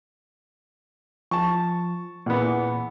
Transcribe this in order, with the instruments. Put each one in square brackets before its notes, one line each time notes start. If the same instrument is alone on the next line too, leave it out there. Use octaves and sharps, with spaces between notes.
[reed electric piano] F3 [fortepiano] A5 C#6
[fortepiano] E2 E3 B3 [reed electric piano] A#2